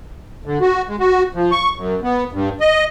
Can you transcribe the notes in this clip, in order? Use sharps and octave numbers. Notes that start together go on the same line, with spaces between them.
D3
F#4
G#3
F#4
F3
C#6
F#2
B3
G2
D#5